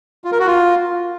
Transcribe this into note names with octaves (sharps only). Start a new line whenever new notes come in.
F4
A#4
F#4
F4